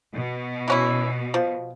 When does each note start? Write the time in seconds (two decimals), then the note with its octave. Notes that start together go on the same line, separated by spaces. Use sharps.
0.13 B2
0.68 E3 C#4 E4
1.34 F3